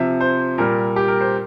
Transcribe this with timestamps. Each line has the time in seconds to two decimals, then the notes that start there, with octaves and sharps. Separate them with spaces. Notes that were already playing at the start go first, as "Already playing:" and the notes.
Already playing: C3 F3 E5
0.21 C5
0.58 A#2 G3 A#4
0.96 G4
1.08 A#4
1.21 C5